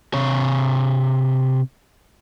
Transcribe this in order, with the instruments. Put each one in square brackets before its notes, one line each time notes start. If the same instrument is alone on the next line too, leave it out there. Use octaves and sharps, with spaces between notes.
[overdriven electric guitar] C3 C#5